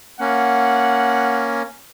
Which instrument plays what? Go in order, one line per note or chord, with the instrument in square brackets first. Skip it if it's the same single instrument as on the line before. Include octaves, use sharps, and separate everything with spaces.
[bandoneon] A#3 C#4 [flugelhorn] F#5